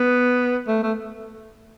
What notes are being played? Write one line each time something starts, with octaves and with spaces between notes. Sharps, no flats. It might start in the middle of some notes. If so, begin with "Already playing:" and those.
Already playing: B3
A3
A3